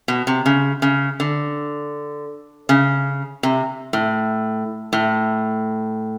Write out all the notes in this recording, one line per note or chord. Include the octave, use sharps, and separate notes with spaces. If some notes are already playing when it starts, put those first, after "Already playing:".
B2
C3
C#3
C#3
D3
C#3
C3
A2
A2